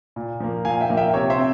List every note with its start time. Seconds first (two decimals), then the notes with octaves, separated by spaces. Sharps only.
0.16 A#2
0.40 F3 A#3
0.65 A#2 F5 G#5
0.81 E5 G5
0.90 F3 A#3
0.97 E5 G5
1.14 C3 C#5
1.30 C5 E5
1.38 C4